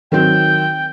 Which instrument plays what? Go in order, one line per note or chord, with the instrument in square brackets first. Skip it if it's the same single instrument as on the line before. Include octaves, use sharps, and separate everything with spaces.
[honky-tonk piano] D#3 F#3 C4 [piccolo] G5